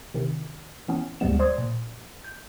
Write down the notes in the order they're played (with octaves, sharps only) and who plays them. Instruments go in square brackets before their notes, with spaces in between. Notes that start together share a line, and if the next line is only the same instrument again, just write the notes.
[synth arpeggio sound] C3 D#3
E3 B3 C#4
D2 G2 G3 G#3 B3 E7
C5 D5 C6 D#6 G#6
A#2
G6